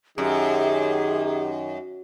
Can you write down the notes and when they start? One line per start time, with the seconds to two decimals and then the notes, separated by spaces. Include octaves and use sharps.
0.18 F#2 D#3 G4 G#4